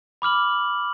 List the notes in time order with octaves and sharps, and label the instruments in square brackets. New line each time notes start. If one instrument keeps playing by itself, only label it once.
[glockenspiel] B5 D6 F6 F#7